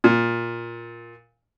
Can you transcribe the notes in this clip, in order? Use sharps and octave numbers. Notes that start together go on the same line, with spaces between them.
A#2